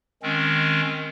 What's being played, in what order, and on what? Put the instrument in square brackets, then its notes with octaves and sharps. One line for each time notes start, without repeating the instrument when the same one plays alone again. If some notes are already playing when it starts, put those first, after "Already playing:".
[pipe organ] D#3 G#3 C4 C#4